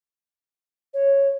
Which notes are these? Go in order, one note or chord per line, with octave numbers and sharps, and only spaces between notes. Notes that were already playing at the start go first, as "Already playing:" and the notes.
C#5